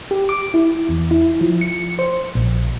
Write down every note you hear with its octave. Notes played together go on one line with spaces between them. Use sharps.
G4
D6
E4
E2
E4
F3
C#7
C5
A#1